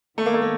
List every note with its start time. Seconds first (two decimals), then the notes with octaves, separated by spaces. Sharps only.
0.18 D#3 G#3 A3 B3
0.26 A#3
0.34 A3
0.42 A#3